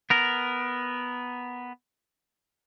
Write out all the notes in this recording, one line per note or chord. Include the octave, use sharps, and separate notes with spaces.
B3 A#4